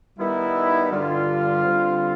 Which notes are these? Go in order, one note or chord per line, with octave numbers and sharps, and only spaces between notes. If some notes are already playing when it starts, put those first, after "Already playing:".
D#3 G3 B3 D#4 E4
G2 D3 G3 F4
D3 G3 C4